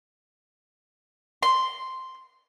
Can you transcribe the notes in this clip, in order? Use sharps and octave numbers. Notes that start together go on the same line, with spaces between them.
C6